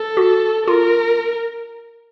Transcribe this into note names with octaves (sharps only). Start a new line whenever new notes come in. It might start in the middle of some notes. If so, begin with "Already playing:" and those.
Already playing: A4
F#4
F4 A#4